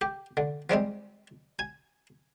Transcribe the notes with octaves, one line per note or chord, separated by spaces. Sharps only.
G4
D3
F3 G3 G#3 C4
G#5